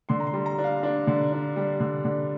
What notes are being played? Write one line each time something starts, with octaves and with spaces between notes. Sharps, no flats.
D3 C6
A#5
C6
G3
A#5
D4
F5
D4 D5
D3
D4
G3
D3
D3